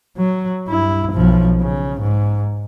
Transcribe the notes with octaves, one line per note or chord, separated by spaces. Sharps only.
F#3
G2 E4
B1 F3
C#3
G#2